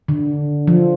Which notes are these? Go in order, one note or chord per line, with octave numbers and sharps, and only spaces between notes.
D3
F3